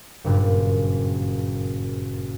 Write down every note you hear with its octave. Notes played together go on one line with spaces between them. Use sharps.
F#1 G2 A#2